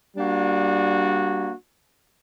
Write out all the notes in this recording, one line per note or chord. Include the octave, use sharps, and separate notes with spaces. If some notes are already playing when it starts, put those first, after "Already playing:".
G3 A#3 D4 F#4